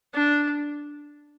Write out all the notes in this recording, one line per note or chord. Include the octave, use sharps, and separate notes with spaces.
D4